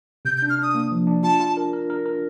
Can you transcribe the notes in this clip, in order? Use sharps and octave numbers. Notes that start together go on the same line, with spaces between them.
C3 G6
G6
D4
F6
D4 D#6
A#3
F3
D4
F4 A5
F4
A#4
A#4
A#4
A#4